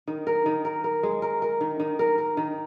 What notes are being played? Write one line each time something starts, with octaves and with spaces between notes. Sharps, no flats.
D#3
A#4
D#3
A#4
A#4
G#3
A#4
A#4
D#3
D#3
A#4
A#4
D#3